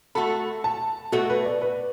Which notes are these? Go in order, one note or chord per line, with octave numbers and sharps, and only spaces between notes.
A3 F#4 A4 B5
A5
B2 A3 F#4 A4
B4
D5
B4